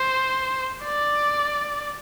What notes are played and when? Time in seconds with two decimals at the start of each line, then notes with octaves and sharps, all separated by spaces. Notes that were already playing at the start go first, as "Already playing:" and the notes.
Already playing: C5
0.84 D5